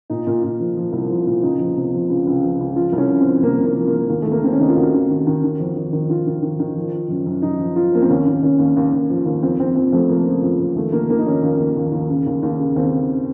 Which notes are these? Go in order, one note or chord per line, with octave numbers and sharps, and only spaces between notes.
A#2 D#4
A#2
A#2
F3
F3
C2
F3
A#2
C#2 D#4
F3
C3
F3
C#2
C#2
F3
C#2
F3 F4
C2
C#4
F3
C4
F3
C2 A#3
C2
A#3
F3
A#3
F3
D#2
D#2 A3
A#3
D#3 C4
C#4
D#3 D#4
F4
D#2 F#4
D#3
D#3
D#3
D#3
F2
D#3
D#3
D#3 F4
D#3
D#3
D#3
F3
F3
F#2
F#2
F#2 D#4
F3
F3 F4
F3 A#3
C4
D#2 C#4
D#2
D#2 C#4
D#2
D#2
D#2
F3
D#2
F2 C4
F3 C4
F2 C4
F2 A3
F3 A#3
C#3
F2
F2
D#2 A3
D#3 A#3
D#3 A#3
D#4
D#3 C#4
D#2
D#2
D#2
D#2
C#3
D#2
D#2
C#3
D#2 C4
C#3